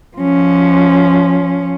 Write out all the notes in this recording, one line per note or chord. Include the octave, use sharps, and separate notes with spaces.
F3 C#4